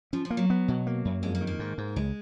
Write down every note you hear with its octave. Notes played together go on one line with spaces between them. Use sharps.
F3 C#4
F3
A#3
F#3
B3
B2
A#3
F#2
F2 G#3
A#3
D#3
A#3
G#2
G#2
C#2 G#3